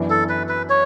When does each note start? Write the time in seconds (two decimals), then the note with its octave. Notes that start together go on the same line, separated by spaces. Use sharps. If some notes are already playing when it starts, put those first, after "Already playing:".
Already playing: F#2 E3 B3 D4
0.10 A4
0.29 B4
0.49 B4
0.69 C#5